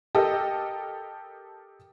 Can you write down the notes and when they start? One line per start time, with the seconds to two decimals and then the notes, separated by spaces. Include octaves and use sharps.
0.15 G4 A4 A#4 D#5